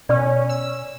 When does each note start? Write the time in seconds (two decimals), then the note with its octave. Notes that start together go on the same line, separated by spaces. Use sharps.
0.09 B2 C#4 D5
0.49 E6